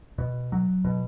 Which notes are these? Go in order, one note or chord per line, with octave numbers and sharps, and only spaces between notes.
B2
F#3
B2